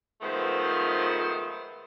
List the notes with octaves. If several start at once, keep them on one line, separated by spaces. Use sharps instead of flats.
D#3 F3 G#3 A3 B3 C5